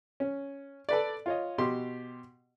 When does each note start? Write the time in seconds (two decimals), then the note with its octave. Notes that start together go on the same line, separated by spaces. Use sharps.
0.20 C#4
0.89 A4 B4 D5
1.26 F4 C#5 D#5
1.58 B2 G4 C6